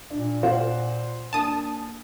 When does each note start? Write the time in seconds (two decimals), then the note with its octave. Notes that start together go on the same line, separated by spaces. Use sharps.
0.10 A#2 D4
0.43 F4 C5 F#5
1.33 A#3 D4 G#5 A5 D#6